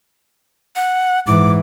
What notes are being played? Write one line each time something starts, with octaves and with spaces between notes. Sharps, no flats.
F#5
G#2 E3 D6